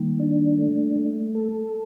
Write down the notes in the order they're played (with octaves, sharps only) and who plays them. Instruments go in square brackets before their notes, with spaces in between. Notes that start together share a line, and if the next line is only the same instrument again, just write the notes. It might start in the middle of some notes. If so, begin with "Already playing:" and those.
Already playing: [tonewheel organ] D#3 [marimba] G3 A#3
[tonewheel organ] D4
A3
A3
A4